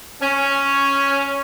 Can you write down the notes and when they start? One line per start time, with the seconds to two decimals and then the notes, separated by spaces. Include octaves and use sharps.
0.21 C#4